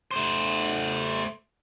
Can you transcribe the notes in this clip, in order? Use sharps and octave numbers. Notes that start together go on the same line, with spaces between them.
A3 C5